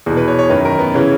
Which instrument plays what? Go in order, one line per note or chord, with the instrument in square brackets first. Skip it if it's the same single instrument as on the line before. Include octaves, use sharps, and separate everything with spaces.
[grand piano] E2 B2 G#4
B4
C#5
C#5
F#2 D#3 B4
A#4
B3
C#3 E3 C#4